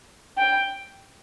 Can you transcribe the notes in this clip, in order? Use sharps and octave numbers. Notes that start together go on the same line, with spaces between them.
G5